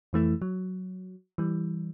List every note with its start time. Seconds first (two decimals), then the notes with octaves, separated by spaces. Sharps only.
0.13 F2 E3 A3 E4
0.42 F#3
1.38 E3 G3